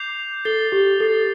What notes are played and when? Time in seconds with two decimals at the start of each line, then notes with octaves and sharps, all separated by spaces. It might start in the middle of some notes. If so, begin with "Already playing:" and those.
Already playing: D6 G6 C7 F7
0.45 A4 A6 C7 G7
0.72 G4
1.00 A4 A6 C7 G7